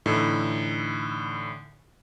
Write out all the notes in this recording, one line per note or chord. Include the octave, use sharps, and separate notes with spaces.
A2 D3 E3 D#4 E4